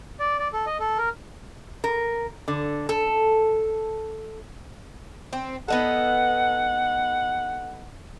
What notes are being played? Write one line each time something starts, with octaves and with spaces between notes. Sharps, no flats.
D5
D5
A4
D#5
A4
A#4
A#4
D3
A4
C4
B3 D#4 A4 F#5